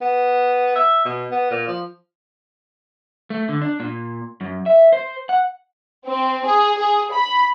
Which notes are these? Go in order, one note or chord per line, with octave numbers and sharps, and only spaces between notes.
B3
E5
B2
B3
A#2
F3
A3
D3
D4
A#2
F#2
E5
C5
F#5
C4
G#4
G#4
B5